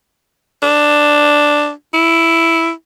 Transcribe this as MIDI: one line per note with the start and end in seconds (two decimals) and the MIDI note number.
0.63 1.70 62
1.93 2.71 64